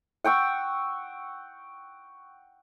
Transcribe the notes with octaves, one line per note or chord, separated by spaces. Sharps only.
F#5 G5 C#6 E6